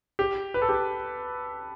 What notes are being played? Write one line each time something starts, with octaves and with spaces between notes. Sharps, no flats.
G4
B4
A4
G4